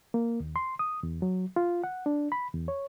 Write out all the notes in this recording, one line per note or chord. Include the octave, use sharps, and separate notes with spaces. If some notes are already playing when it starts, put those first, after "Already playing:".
A#3
D#2
C6
D#6
E2
F#3
F4
F#5
D4
B5
E2
C#5